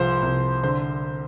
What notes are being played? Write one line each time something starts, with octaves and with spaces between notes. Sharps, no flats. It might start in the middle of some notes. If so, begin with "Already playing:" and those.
Already playing: C2 F3 C5
C2
D3 C5